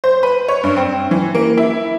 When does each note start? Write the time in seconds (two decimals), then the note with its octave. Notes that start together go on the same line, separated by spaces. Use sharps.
0.04 C5
0.23 B4
0.48 C#5
0.63 G2
0.77 C4
1.11 E3
1.35 A#3
1.58 E4